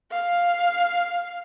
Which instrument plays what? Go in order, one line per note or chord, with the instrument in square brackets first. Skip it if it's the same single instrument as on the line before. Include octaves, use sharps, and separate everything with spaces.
[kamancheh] F5